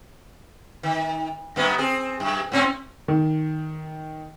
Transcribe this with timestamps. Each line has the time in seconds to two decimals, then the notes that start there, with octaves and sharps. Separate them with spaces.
0.83 D#3
1.56 F#2 A#3 B3
1.78 C4 G#4
2.20 F#2
2.52 G#2 C4 C#4
3.08 D#3